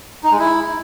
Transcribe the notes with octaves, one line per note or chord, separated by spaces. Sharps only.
D#4
G#3
E4